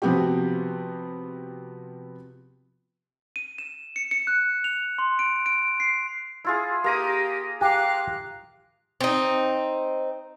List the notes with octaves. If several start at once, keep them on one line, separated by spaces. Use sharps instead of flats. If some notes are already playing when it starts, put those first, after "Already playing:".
C3 F3 B3 C4 F#4 G4
D#7
E7
C#7
C#7
F#6
F7
C6
D7
D7
C7
E4 F4 G#4
A#3 G4 A#5 D#6
G4 F5 D6 F#6
C4 D#4